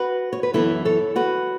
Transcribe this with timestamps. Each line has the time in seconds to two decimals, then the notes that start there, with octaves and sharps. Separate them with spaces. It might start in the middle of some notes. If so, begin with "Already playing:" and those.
Already playing: F#4 B4
0.33 C#5
0.43 B4
0.54 F#2 E3 B3 E4 A4
0.85 A4 C#5
1.16 F#4 B4